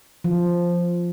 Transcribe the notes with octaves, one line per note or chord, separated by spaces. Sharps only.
F3